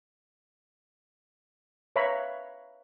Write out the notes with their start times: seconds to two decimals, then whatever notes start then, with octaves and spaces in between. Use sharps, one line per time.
1.96 B4 C#5 E5 F5 A#5 B5